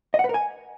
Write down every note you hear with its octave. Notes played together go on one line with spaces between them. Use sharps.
D#5
F#5
B4
A#4
G#5